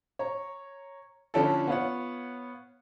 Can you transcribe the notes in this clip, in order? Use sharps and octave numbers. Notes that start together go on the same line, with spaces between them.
C#5 A#5
D3 F3 C#4 D4 E4 A4
B3 F4 C#5 F#5